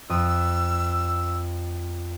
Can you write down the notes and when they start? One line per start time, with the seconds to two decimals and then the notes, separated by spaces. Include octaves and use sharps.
0.09 F2 D#6 E6